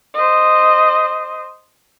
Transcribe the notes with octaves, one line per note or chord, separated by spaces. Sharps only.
C5 D#5